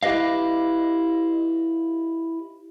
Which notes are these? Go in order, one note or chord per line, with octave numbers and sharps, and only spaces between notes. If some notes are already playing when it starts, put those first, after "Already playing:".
E4 G4 B4 D#5 F5